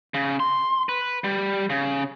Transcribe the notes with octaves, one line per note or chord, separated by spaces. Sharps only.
C#3
C6
B4
G3
C#3